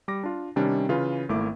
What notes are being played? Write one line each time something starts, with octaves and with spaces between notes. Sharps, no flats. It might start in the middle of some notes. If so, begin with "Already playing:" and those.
G3 D6 A#6
D4 F4
C3 D#3 G3 C#4 D4
C#3 E3 F4 B4
G#1 A3 A#3 E4 D6